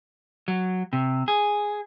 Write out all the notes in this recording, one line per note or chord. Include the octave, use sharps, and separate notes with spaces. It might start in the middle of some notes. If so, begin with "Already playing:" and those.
F#3
C3
G#4